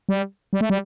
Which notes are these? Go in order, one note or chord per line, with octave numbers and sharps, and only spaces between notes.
G3
G3
A3
G3